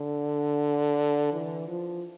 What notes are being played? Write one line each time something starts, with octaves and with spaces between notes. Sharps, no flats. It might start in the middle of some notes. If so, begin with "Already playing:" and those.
Already playing: D3
E3
F3